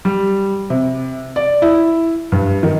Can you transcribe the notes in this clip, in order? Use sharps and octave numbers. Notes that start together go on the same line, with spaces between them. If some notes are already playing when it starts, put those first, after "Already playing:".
G3
C3
D5
E4
G2
D#3